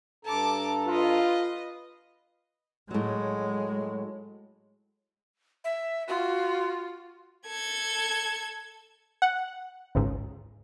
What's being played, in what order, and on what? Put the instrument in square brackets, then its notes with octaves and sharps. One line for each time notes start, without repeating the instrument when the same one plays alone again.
[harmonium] G2 A4 A#5 [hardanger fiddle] A5 D6
[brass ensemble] F4 [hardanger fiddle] B4 D#5
[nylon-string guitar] A2 F#3 [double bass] G#3
[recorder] E5
[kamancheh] F4 [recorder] F#4
[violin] A4 G#6
[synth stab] F#5
G#1 C#2 G#2